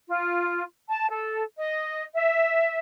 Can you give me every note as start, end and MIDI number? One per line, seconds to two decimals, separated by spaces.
0.07 0.62 65
0.88 1.08 81
1.09 1.41 69
1.57 2.02 75
2.14 2.77 76